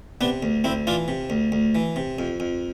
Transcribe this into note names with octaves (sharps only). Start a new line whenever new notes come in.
C3 B3 D4
D2
D2 C4 E4
E3 D4 F4
C3
D2
D2
E3
C3
F2
F2